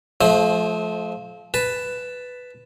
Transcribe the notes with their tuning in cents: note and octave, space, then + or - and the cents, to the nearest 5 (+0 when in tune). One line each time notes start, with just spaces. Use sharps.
F3 +0 A3 -35 C5 +20
B4 +5 A5 +0